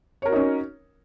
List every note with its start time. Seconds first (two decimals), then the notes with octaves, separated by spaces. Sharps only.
0.22 C#5
0.26 A#4
0.29 F#4
0.32 D#4
0.36 C#4